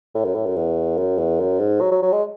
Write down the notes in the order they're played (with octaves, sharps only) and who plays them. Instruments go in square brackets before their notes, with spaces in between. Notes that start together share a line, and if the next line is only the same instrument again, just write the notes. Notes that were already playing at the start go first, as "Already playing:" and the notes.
[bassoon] A2
F#2
A2
F#2
E2
F#2
E2
F#2
G#2
F#3
F#3
F#3
G#3